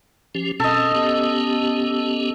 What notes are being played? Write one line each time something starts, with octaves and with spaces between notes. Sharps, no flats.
F3 C#4 G4
B2 C4 C#4 A4 D#5
B3 C#4 G4